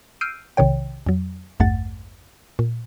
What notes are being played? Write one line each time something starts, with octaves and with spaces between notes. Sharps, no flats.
E6 F6 G6 C7 D7 D#7
B1 C3 D#3 C#5 G5
F2 F#3
A1 E2 G2 A3 F#5 A6
A#2